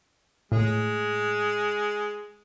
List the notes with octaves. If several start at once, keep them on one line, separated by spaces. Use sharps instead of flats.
A2 G#3